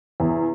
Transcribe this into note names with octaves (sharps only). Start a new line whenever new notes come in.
E2